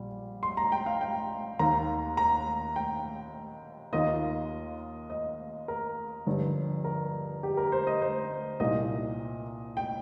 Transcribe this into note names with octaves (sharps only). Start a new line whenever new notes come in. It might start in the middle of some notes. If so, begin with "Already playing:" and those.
Already playing: A#1 A#2 G3
C6
A#5
G5
F5
G5
D#2 D#3 A#3 A#5
A#5
G5
D#2 D#3 A#3 F4 D#5
D#5
A#4
G1 G2 F3
A#4
G4
A#4
C5
D#5
C5
C2 A#2 A#3 D#4 D#5
G5